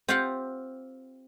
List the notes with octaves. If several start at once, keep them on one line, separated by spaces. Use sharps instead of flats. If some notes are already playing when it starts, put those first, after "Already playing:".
C4 F4 G4 F5 F#5